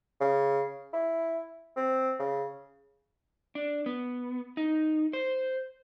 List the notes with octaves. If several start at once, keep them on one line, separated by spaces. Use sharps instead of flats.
C#3
E4
C4
C#3
D4
B3
D#4
C5